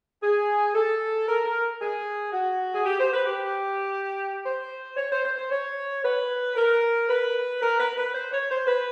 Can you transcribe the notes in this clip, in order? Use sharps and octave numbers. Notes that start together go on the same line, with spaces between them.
G#4
A4
A#4
A#4
G#4
F#4
G#4
G4
C5
B4
G4
C5
C#5
C5
C5
C5
C#5
B4
A#4
B4
A#4
B4
B4
C5
C#5
C5
B4